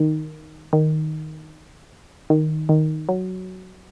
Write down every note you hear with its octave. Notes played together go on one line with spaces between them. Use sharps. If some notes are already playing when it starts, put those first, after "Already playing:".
Already playing: D#3
D#3
D#3
D#3
F#3